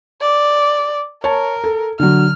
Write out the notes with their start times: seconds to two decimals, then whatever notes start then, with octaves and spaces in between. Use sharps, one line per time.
0.21 D5
1.24 A#4 C#5 A5
1.64 A4
2.00 D3 F#3 F6